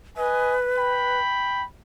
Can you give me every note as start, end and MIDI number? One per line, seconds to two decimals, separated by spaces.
0.17 1.20 71
0.17 0.54 75
0.17 0.54 80
0.77 1.64 79
0.77 1.64 83